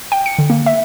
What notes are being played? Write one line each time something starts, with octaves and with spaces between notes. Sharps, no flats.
G5
C#7
D3
A#3
E5